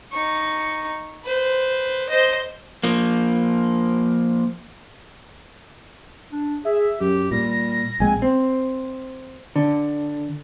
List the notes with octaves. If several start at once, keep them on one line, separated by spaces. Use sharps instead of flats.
D#4 C#6
B4 C5
C5 D#5
F3 A#3
D4
G#4 E5
F#2 G4
A#2 G3 A#6
A#1 G#3 C4 G#5
C4
D3